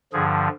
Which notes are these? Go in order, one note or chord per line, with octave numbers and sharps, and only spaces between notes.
G2 D3 F3 G#4